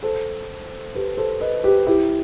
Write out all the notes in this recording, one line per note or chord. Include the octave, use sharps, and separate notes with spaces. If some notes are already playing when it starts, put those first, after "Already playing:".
A4 C5
G4 B4
A4 C5
B4 D#5
G4 B4
E4 G4